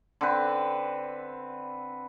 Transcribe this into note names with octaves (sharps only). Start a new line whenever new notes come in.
D3 C4 B4